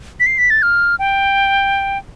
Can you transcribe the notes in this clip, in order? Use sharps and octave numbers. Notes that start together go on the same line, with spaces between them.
B6
C7
B6
A6
F6
G5